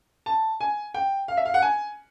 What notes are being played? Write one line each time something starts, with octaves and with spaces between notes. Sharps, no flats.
A5
G#5
G5
F5
E5
F5
F#5
G#5